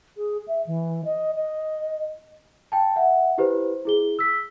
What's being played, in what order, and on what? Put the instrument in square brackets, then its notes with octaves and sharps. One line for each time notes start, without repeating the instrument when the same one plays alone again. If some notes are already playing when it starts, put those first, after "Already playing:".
[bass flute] G#4
E5
E3
D#5
D#5
[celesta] G5 A5
E5 F#5
E4 G4 B4 C5
E4 G#4 G7
E6 B6